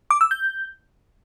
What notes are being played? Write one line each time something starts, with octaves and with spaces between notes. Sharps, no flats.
D6
E6
G6